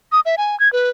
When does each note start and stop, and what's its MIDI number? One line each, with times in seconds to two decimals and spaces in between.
0.12 0.20 87
0.25 0.35 76
0.38 0.58 80
0.60 0.71 92
0.73 0.90 71